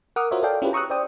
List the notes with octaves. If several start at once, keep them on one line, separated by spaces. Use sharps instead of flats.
A#4 F#5 D6 D#6 F6
F4 F#4 A#4 C5 C#5 E5
A4 D5 F5 G5
C#4 E4 F4 G4 G#4 B4
A#5 C#6 D#6 E6 F#6
C5 D5 G5 D#6